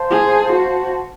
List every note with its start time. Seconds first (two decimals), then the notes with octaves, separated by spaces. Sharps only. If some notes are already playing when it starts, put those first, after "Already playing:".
Already playing: C5 F5 A5 C6
0.10 G#4
0.51 F#4